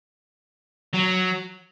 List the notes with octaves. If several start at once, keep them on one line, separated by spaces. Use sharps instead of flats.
F#3